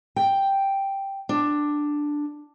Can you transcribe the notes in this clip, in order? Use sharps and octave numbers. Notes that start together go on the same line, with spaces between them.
G5
D4